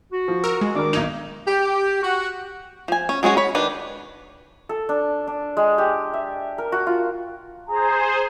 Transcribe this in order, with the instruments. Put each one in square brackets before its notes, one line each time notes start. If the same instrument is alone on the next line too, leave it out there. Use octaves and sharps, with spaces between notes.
[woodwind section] F#4
[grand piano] F3
[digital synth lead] A#4 [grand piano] E6
[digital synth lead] G#3
[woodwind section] D#3 D6 [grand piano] D4 A#4
[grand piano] B1 G#6 F7 [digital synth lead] D#4
[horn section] G4
F#4
[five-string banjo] F3 G#5
C#4
F#3 G#3 C#4 F#4
C#5 B5
D#3 D4 B4
[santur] A4
D4
D4
G#3
G4
E5
A#4
F#4
F4
[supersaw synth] G#4 C5 [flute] A#5